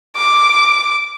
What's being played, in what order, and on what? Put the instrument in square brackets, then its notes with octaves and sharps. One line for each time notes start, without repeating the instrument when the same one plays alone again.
[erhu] D6